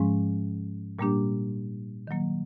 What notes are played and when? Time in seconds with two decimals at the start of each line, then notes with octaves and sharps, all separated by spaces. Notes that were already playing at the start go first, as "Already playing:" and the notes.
Already playing: G#2 F3 G#3 C#4
0.99 A#2 G3 A#3 D4 G4
2.07 D#3 F#3 A#3